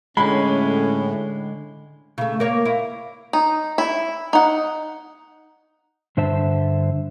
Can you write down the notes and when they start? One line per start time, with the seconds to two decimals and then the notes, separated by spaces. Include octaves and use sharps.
0.17 A2 D3 G#3 C#4 B5
2.18 C#3 A3
2.40 A#3 C#5
2.65 E4
3.33 D#4
3.78 E4
4.33 D#4 F#5
6.17 G2 D3 C5 E5 A5